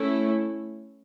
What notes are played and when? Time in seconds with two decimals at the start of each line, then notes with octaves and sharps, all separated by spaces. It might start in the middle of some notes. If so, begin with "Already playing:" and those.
Already playing: A3 C#4 E4